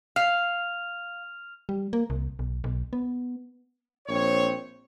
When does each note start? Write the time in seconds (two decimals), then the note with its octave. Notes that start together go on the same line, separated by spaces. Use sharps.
0.16 F5 F6 F7
1.69 G3
1.93 A#3
2.10 C2
2.39 B1
2.64 B1
2.93 B3
4.08 A#1 C4 C#5